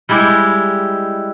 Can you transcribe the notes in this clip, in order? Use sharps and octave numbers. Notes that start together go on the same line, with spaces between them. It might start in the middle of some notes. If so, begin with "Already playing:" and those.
G3 G#3 E4 G4